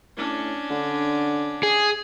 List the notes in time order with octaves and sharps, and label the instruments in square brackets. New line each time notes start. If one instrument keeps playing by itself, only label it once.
[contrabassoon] A2 [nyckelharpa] C#4 D4
[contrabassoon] D3
[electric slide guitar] G#4